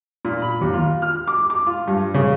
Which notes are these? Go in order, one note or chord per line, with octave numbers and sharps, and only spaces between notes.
A#2
B5
D#2
F4
F6
D6
D6
F4
G2
C#3